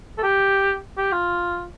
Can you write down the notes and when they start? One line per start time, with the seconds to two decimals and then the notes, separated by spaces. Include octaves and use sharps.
0.18 A4
0.23 G4
0.98 G4
1.12 F4